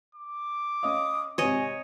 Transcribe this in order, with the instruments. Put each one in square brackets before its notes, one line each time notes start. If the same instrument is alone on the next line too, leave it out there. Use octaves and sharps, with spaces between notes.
[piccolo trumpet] D6
[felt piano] C#4 D#5 F5 [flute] D#6
[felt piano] G#1 C3 [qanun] C#5 D#5 [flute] G#5